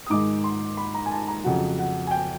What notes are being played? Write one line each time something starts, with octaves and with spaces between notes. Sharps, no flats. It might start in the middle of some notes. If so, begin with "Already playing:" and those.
D#6
G#2 D#3 G#3 D6
C6
B5
A#5
G#5
A5
A#5
F2 C#3 F#3 F#5
F#5
G#5
G5